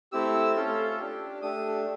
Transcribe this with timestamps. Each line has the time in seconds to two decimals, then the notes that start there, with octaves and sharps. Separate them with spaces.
0.12 A3 C4 E4 G4 E6
0.56 A3 C#4 F4 A4
0.99 D4 G4
1.42 A3 D4 G4 D#6